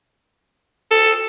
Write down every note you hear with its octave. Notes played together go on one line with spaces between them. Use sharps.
A4